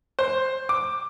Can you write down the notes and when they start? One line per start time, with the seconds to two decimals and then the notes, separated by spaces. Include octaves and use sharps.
0.19 C5
0.69 D6